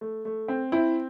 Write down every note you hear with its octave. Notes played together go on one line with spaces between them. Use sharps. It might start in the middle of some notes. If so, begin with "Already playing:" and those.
A3
A3
C4
C4 E4